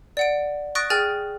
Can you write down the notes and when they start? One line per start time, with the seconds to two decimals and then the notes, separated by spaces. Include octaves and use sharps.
0.17 D5 F#5 D7
0.75 C#6 D#6 F#6 A6 A#6 D7
0.90 G#4 G5 G#5 F6 A6